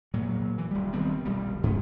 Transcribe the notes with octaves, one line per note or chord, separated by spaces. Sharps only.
A#2 F#3
E3
D#1 G3
D#3 G3 B3 C4
D#1 B1 G3
G2 C#4